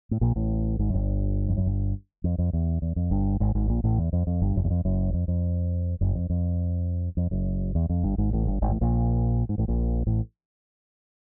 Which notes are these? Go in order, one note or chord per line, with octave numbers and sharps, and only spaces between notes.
A2
A#1 A#2
A1 A2
G#1 G#2
F#2
G1 G2
F2
F#2
G1 G2
F2
F2
E2
E2
F2
G1 G2
G#1 G#2
G#1 G#2
A#1 A#2
A1 A2
E2
F2
F2
G1 G2
F#1 F#2
E2
F2
F#1 F#2
F2
F2
F#1 F#2
F2
F2
F2
F#1 F#2
E2
F2
G1 G2
G#1 G#2
A1 A2
G1 G2
G#1 G#2
A1 A2
A#1 A#2
G#2
A1 A2
A#1 A#2
A1 A2